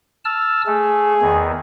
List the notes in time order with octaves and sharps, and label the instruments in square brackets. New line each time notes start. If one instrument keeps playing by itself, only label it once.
[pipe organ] A5 E6 F6
[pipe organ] A3 [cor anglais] G#4
[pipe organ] E2 D#3